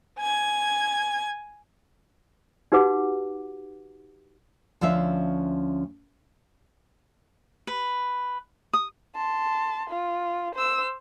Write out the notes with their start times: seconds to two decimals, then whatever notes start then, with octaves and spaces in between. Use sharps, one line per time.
0.19 G#5 G#6
2.72 D#4 F#4 G4 B4 F#5 D6
4.81 D2 F3 C#4 E5 F5
7.67 B4
8.73 D#6
9.15 A5 C6
9.90 F4
10.55 C5 E6